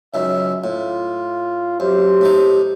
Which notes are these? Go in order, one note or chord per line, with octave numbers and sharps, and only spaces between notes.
C#2 F#2 D#3 E5
A2 F4
F#2 G4 C5
A2 A3 D#4